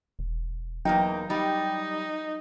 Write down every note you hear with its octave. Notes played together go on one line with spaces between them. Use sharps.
E1
E2 F#3 A#3 D#4 G5
G3 D#4 G4